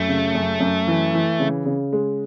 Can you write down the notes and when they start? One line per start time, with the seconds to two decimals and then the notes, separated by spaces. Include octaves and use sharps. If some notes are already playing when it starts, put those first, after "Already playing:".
Already playing: F#2 A3
0.08 C#3
0.35 F#2
0.60 F#2
0.87 E3
1.14 E3
1.40 C#3
1.65 C#3
1.93 G#3